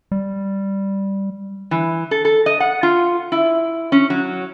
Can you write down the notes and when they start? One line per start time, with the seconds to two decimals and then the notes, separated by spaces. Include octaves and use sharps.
0.12 G3
1.71 E3
2.11 A4
2.25 A4
2.46 D#5
2.60 F#5
2.83 F4
3.32 E4
3.92 C#4
4.10 F#3